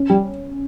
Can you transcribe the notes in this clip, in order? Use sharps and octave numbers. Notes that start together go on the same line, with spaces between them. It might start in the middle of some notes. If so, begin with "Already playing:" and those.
Already playing: C#4
G3